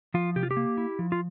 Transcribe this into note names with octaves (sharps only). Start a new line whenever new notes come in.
F3 F4
C3 G4
F4
G4
A#3
E4
F3
F4